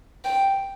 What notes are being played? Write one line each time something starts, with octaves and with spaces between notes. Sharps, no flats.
G5